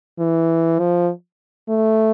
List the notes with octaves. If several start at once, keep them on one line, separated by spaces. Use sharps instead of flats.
E3
F3
A3